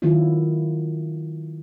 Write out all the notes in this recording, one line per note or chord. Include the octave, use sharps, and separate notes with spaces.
D#3 F#3 B3 E4 F4